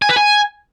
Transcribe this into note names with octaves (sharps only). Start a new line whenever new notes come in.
G#5
B4
G#5